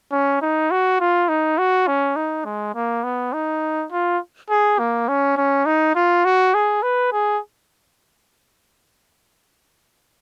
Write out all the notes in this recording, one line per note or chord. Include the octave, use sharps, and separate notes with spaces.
C#4
D#4
F#4
F4
D#4
F#4
C#4
D#4
G#3
A#3
B3
D#4
F4
G#4
A#3
C#4
C#4
D#4
F4
F#4
G#4
B4
G#4